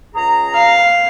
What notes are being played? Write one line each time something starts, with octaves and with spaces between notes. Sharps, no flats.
C#2 G#4 A#5
F5